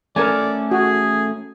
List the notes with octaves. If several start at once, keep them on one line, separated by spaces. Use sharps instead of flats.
A3 C#4 A4 A#4 D5 G#5
F#4 G#4